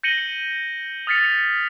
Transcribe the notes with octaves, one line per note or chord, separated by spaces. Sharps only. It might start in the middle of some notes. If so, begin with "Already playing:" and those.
G6 A#6 C#7 D#7 F#7 G7
D#6 F6 A6 B6 C#7 F7